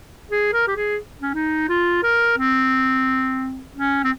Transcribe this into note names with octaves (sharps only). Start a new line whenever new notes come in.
G#4
A#4
G4
G#4
C#4
D#4
F4
A#4
C4
C#4
C4